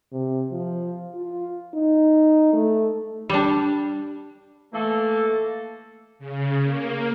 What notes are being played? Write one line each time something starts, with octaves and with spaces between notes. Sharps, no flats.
C3
F3
F4
D#4
A3
G3 D4
E3 A3 A#3 A4
C#3
A#3